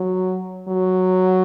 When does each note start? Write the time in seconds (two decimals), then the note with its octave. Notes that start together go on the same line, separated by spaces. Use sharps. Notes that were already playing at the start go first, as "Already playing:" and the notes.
Already playing: F#3
0.68 F#3